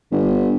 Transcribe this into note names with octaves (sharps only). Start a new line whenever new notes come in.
G1